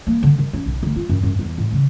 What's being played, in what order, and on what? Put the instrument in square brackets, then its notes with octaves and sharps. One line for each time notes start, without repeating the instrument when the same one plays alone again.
[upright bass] A#3
D3
D#3
C#4
B1
D2
F4
F#2
F#2
E2
A2
C#3